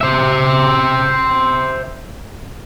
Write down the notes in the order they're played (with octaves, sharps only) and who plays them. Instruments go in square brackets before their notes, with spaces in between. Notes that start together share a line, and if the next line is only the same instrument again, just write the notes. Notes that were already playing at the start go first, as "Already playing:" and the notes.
[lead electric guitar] C5 E5